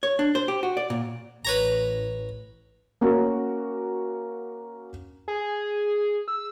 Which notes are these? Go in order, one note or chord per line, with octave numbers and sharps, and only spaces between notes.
C#5
D4
C5
G4
F#4
D5
A#2
A1 B4 C#5 A#5
A#3 C#4 F#4 A#4
G#4
E6